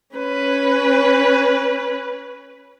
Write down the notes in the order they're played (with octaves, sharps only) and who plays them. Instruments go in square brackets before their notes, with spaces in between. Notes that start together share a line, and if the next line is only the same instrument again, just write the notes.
[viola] C#4 B4